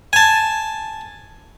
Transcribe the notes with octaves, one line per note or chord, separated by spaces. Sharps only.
G#5 A5